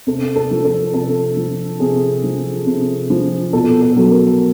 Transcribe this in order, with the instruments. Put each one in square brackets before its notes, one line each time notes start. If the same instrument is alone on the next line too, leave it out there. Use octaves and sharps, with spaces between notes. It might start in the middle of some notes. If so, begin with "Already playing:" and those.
[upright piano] C3 A4
A4
F3
A4
C3 A4
F3
C3 G#4
F3
C3
F3
B2 A4
A4
F#3
A#4